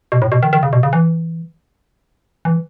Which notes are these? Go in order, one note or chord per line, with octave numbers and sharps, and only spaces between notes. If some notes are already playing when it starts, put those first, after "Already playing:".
B2
A2
B2
D#3
D#3
C#3
B2
C#3
E3
E3